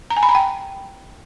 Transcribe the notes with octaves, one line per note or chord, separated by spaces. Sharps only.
A#5
G#5
B5
A#5
G5